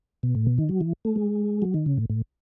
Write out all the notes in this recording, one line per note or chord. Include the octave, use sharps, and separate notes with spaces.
B2
A2
B2
D#3
F#3
E3
A3
G#3
F#3
D#3
C#3
A2
A2